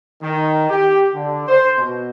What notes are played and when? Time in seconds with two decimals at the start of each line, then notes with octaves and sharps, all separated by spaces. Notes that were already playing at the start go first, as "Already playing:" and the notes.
0.22 D#3
0.69 G4
1.14 D3
1.47 C5
1.77 B2